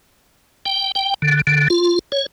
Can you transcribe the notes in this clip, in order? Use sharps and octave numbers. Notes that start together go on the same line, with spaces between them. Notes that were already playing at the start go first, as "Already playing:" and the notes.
G5
G5
D3
D3
F4
C#5